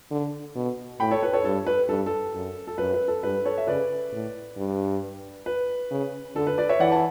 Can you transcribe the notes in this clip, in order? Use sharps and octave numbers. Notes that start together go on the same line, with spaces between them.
D3
B2
A2 G5 B5
A4 C#5
B4
A4 C#5
G2 A4
B4
G2 A4
A4
F#2
A4
F#2 B4
B4
A4
G2 B4
A4 C#5
E5
C#3 B4 D5
A2
G2
B4
C#3
D3 A4
B4
B4 D5
C#5 E5
E3 D5 F#5
F#5 A5